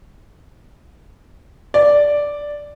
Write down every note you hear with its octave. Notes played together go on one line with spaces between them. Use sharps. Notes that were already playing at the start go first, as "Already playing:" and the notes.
D5